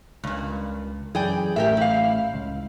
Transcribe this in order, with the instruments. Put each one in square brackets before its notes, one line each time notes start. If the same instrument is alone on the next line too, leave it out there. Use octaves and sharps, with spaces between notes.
[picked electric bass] C#2 [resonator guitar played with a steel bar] G2 A#2
[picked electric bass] F#2 E3 [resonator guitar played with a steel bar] G#4 D5 G5
[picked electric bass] A1 A2 [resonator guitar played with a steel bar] G4 A#4 E5
[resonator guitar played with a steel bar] E4 F5
[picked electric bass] C#2